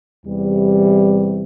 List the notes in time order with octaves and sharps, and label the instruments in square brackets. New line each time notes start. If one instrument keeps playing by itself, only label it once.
[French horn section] E2 C3 E3 G3